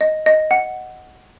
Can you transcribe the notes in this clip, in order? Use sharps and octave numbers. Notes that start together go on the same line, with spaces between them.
D#5
D#5
F#5